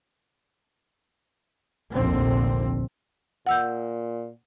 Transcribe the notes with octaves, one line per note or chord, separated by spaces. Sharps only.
F1 A#1 D#2 D3 C4
A#2 F#5 E6 G6